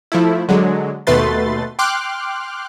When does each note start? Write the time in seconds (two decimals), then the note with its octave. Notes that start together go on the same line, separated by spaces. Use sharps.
0.12 F3 A3 E4
0.49 D3 F#3 G#3
1.07 D#2 B2 A3 B4 C6 A6
1.79 G5 C6 D6 F6 F#6